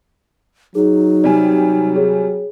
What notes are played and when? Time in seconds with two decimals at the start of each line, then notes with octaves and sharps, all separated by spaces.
0.75 F#3 D#4 G#4
1.24 C3 G3 D5 G#5
1.96 G#4 C#5